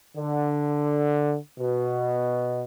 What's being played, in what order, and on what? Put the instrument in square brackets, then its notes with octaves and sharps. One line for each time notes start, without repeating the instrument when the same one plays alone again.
[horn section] D3
B2